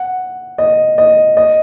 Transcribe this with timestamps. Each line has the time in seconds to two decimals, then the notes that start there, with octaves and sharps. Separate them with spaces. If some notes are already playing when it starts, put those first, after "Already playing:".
Already playing: F#5
0.58 D#5
0.98 D#5
1.37 D#5